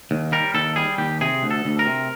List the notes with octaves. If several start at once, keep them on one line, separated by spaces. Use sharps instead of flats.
D#2
G3 A#4
D#2 A4
G3 G#4
D#2 G4
C3 G#4
D2
A4
D2
A#4
C3